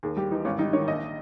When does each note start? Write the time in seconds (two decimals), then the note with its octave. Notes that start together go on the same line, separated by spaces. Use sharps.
0.03 D#2 G#4
0.17 G3 G4
0.31 E3 D#4
0.45 G#1 C#4
0.59 G3 D#4
0.73 D#3 C#5
0.88 A#1 D#5